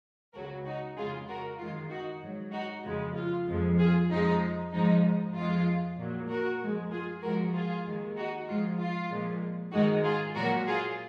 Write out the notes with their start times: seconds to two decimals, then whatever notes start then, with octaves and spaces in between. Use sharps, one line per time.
0.34 C#2 C#3 F#3 F#4 A#4
0.65 D#4 F#4
0.97 F2 C#3 G#3 F4 G#4
1.28 F#4 A#4
1.59 F#2 D#3 G#3 F4
1.90 D#4 F#4
2.21 G#2 F#3
2.53 D#4 F#4
2.84 F2 C#3 F3 G#3
3.15 F4
3.48 F2 F3 G#3
3.78 F4 G#4
4.10 F2 F3 G#3 D#4
4.72 G#2 F3 G#3 D#4
5.34 F2 F3 G#3 F4
5.98 A#2 F#3
6.28 F#4 A#4
6.60 F#2 F3 G#3
6.91 F4 G#4
7.22 G#2 F3 G#3 F#4 A#4
7.54 F4 G#4
7.86 D#2 D#3 G#3
8.17 D#4 F#4
8.48 G#2 F3 G#3 F4
8.78 F4
9.10 A#2 F3 G#3
9.72 G#2 D#3 G#3 D#4 F#4
10.04 F4 G#4
10.35 A#2 F#3 F#4 A#4
10.67 F4 G#4